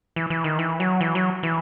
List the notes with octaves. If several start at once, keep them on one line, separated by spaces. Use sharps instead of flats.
E3
E3
D#3
E3
F#3
E3
F#3
E3